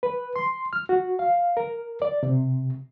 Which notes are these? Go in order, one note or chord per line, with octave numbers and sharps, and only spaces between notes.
B4
C6
F6
F#4
F5
A#4
D5
C3